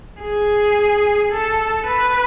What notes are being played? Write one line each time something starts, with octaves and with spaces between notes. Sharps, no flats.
G#4
A4
B4